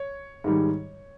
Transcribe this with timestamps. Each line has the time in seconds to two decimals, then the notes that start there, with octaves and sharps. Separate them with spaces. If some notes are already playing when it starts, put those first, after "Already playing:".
Already playing: C#5
0.44 G#2 D#3 G3